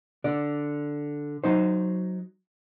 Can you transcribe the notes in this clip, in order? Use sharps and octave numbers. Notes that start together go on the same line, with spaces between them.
D3 D5
F#3 D#4 C5